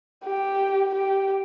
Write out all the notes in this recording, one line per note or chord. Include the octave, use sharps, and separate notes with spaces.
G4
G4